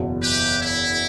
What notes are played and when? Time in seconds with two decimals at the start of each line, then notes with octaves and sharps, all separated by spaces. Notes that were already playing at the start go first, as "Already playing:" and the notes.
Already playing: F#1 E2 B2
0.22 G4 B4
0.61 E4